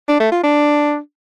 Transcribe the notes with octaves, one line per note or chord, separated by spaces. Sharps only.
D4
A3
F4
D4